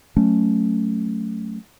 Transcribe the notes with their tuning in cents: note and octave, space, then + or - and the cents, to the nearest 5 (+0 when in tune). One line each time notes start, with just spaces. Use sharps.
F#3 +0 A3 +0 C#4 +0